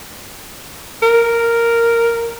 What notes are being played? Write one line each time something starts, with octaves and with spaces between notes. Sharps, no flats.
A#4